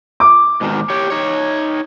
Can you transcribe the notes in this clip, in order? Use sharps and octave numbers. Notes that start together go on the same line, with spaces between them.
D6
G#2 B2 D#3
G4 C#5
D#4 C#5